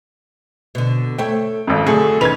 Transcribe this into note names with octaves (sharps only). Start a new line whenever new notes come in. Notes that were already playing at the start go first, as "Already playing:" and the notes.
B2 D3
A3 C#5 G5
G#1 F2
D3 F#3 A3 G#4 A4
D#3 C#4 B4 G#6 F7